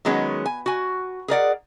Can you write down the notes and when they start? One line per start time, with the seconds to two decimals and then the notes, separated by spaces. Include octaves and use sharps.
0.05 D#3 F#3 G#3 B3 C#4
0.46 G#5
0.66 F#4 G#5
1.28 G#4 A#4 D5 F#5